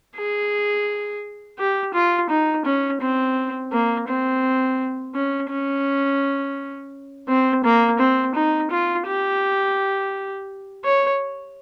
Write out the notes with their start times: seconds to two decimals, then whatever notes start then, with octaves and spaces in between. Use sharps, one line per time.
0.16 G#4
1.59 G4
1.94 F4
2.30 D#4
2.65 C#4
3.01 C4
3.72 A#3
4.08 C4
5.15 C#4
5.49 C#4
7.28 C4
7.64 A#3
7.99 C4
8.35 D#4
8.71 F4
9.06 G4
10.84 C#5